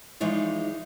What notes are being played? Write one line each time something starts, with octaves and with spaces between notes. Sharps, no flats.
E3 F3 G#3 D#4 C#5 D5